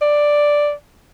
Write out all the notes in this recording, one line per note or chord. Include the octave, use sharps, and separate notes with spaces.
D5